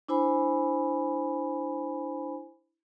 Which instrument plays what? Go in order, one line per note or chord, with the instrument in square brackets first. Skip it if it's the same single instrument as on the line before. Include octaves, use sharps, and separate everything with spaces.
[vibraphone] D4 E4 C5 G#5 B5